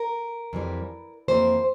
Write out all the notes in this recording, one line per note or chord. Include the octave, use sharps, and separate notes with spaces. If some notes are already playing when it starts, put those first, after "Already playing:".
Already playing: A#4
F2 E3 G3
F2 E3 A#3 C5